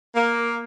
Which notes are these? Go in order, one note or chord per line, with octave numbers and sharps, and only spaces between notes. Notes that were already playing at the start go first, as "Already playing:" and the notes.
A#3